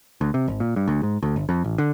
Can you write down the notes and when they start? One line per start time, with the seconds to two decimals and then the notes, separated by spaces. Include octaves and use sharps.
0.21 D2
0.34 C3
0.48 G#1
0.60 A#2
0.76 G2
0.88 D2
1.03 G#2
1.23 D2
1.36 G1
1.49 F2
1.64 A1
1.78 D3